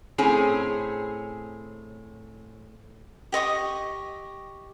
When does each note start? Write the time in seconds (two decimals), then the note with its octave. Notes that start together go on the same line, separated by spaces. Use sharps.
0.18 A2 C4 C#4 G#4
3.32 G4 D#5 C#6 D#6